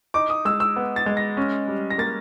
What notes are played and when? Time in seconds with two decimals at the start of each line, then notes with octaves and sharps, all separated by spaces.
0.14 D#4 D6
0.30 D#6
0.45 G#3 E6
0.60 E6
0.76 B3
0.96 A6
1.06 G#3
1.17 A#6
1.37 C#4
1.68 G3
1.91 A#6
1.98 A#3 A6